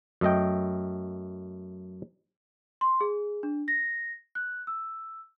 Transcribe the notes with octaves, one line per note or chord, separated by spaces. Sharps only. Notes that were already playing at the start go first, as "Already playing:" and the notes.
F#2 A3 D#5 G5
C6
G#4
D4
A#6
F#6
E6